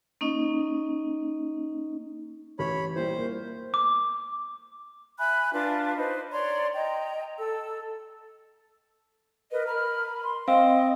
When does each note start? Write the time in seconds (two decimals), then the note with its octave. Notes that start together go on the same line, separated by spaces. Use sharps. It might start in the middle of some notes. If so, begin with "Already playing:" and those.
0.21 A#3 C#4 D#4 D#5
2.59 A1 C#5 B5
2.95 A#2 G3 E4 C5
3.18 A#3
3.74 D6
5.19 E5 G#5 B5 F#6
5.53 D4 F4 B4 A5
5.96 D#4 B4 C5
6.31 C#5 D5 A#5 C6
6.74 D#5 G5 A#5
7.38 A4 E6
9.52 A#4 B4 D#5
9.67 A#4 A#5 B5 F6
10.24 C6
10.48 C4 D#5 F5